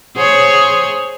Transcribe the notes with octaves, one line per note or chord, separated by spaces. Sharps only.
G#4 C5 C#5